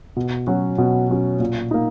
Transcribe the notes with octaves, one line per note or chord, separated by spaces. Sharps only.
B2
F#3 C#4 F#4
B2
F#3 C#4 F#4
A#2
A#3 D#4